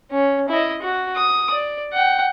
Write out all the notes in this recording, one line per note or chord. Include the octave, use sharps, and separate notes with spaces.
C#4
E4 D#5
F#4
D#6
D5
F#5 G5